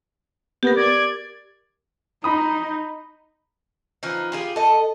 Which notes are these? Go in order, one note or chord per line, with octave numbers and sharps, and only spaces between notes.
B3 G4 A#4
D5 G#6
D#4 A#5 B5 D#6
E3 F3 D#4
F4 G4 G#4
A4 D#5